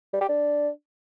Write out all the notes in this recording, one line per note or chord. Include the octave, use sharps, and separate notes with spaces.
G3
G4
D4